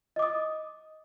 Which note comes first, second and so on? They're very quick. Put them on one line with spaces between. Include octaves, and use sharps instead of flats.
D#5 D6 D#6